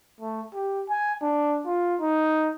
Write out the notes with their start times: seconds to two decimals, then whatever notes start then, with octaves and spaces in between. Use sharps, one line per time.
0.21 A3
0.54 G4
0.89 G#5
1.22 D4
1.66 F4
2.01 D#4